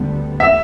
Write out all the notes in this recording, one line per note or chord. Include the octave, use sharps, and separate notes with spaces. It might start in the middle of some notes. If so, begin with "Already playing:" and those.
Already playing: D2 D3 G3 B3
E5